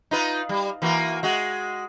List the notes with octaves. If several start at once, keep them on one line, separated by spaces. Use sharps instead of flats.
D#4 F4 B4
G3
E3 A#3 F#4
G#3 F#4